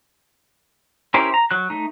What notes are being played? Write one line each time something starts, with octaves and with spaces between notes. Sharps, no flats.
C#4 E4 G4 A#4 C5
A#5
F#3 F#6
A3 D#4